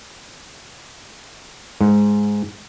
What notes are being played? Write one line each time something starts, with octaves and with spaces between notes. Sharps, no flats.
G#2